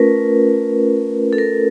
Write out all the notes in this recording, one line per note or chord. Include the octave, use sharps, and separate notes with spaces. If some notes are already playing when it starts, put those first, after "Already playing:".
Already playing: A3 C#4 F4 A#4 B4
A4
A#4